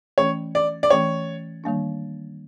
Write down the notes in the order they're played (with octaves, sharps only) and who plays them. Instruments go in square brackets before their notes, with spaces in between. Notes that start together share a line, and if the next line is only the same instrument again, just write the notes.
[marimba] E3 A3 C#4 [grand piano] C#5
[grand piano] D5
D5
[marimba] E3 A3 C#4 [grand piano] C#5
[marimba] D#3 G3 A#3 D4